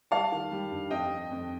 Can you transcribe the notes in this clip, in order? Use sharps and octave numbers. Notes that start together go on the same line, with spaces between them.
G3 F5 A5
D#3
G3
G2
F2 D#5 G5
F2
F2